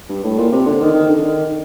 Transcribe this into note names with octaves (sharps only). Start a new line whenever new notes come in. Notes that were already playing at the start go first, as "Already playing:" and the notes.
G2
A2
A#2
C3
D3
D#3
D#3
D3
D#3